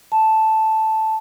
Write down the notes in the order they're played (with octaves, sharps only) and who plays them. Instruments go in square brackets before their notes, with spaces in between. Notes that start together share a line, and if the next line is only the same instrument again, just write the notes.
[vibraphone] A5